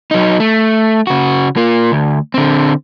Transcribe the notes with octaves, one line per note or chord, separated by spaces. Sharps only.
F#3 D#4
A3
C#3 F#4
A#3 F4
D2
D3 C4